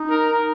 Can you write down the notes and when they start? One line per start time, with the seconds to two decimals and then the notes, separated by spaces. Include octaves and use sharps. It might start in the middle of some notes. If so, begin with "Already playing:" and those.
Already playing: D#4
0.09 A#4 A#5